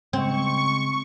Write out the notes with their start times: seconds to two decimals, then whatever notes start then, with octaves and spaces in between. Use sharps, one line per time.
0.13 C#3 G#3 C4 C#6